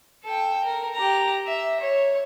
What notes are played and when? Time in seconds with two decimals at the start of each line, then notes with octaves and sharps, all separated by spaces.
0.24 A4 G5
0.64 A#4
0.95 G4 A#5
1.46 E5
1.80 C#5